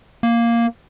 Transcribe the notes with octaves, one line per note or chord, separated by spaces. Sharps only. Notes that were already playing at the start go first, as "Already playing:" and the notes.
A#3